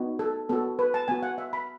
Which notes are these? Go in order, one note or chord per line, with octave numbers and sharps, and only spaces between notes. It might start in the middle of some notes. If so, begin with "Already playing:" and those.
Already playing: B3 D#4 F#4
A4
B3 F#4 A4
B4
A5
B3 F#4 G#5
F#5
E5
B5